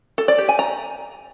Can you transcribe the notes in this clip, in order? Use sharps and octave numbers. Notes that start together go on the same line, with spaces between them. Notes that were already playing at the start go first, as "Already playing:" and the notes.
A4
D5
G4
G#5
A#5